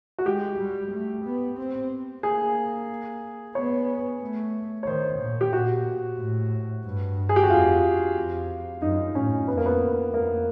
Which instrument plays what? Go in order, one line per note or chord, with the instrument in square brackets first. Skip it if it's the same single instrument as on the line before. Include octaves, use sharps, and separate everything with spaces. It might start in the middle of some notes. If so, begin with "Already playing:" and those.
[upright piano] F#4
[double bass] G#3 [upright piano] G4
[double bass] G3
A3
B3
C4
[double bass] A#3 [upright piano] G#4
[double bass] B3 [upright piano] C#5
[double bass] A3
[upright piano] C#5
[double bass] D#3 [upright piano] C5
[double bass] A#2
[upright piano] G4
[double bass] A#2 [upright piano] F#4
[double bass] A2
G2
[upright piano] G#4
G4
F#4
[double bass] F2 [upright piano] F4
[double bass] F2
[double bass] F#2 [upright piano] D#4
[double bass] A2 [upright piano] C#4
[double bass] F2 [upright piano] B3
[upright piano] A#3
B3
[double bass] F2 [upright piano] A#3